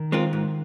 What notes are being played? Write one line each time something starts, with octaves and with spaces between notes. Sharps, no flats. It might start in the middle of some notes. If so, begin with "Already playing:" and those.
Already playing: D#3
G#3 C4 F4 A#4
G#2